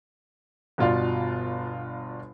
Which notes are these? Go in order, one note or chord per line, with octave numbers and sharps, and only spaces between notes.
G1 B2 F4 D5 F5